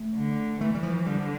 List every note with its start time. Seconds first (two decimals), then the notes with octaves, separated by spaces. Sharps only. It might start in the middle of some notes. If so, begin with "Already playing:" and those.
Already playing: A3
0.16 D3
0.61 E3 A3
0.75 G3
0.83 F3
1.06 D3 G3